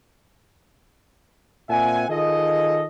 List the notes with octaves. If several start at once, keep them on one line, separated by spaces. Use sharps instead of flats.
A#2 C4 E5 F#5 G#5
D#3 F4 G#4 A4 D#5